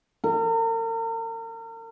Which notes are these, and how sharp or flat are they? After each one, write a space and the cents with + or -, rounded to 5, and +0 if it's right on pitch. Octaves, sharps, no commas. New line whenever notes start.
A#4 -40